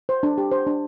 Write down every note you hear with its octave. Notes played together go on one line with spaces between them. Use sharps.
C5
D4
G4
C5
D4